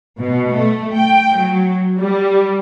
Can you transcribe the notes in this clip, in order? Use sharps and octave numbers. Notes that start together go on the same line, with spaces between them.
B2
A3
G5
F#3
G3